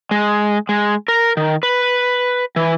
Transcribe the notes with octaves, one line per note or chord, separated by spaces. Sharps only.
G#3
G#3
A#4
D#3
B4
E3